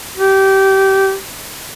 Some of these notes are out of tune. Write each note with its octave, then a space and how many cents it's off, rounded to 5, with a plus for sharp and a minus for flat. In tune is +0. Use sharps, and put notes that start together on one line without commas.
G4 -20